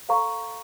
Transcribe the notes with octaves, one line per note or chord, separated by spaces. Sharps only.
A4 C5 F5 A#5 C#6